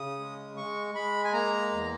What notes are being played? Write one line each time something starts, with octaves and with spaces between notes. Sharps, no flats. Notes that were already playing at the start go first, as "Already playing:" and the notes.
Already playing: C#3 D#6
G#3
G#3 C#6
G#3 B5
G#5
A#3 A#5
E2